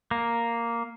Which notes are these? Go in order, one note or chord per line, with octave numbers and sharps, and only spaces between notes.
A#3